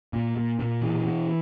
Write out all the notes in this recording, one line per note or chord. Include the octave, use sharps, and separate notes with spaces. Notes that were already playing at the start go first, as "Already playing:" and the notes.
A#2
A#2
A#2
B2 E3
B2